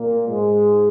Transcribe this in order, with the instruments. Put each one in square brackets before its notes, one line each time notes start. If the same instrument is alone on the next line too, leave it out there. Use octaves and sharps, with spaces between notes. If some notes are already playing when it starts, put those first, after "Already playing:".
Already playing: [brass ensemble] A#2 A#3
G#2 G#3